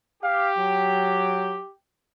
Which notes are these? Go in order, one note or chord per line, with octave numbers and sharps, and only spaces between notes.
G4 F5
F#3